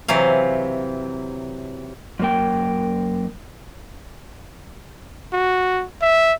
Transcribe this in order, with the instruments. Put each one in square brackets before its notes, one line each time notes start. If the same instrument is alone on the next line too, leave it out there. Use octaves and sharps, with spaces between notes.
[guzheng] C3 E3 F#3 F5
[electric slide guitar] F#2 A#3 G5
[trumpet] F#4
E5